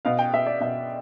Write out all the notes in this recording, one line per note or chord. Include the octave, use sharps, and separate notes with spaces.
B2 F5
G5
B2 E5
D5
B2 E5